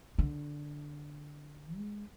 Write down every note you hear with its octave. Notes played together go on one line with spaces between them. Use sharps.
D3
G#3